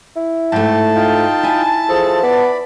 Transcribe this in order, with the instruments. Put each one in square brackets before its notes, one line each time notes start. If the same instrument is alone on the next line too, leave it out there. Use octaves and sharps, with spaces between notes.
[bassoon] E4
[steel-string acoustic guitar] G#2 A3 [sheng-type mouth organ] G5 [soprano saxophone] A5
[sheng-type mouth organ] D#4 F4 G5
[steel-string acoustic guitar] E4 E5 G#5
[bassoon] F3 [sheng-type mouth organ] G#4 A4
[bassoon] B3 [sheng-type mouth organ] D5 B5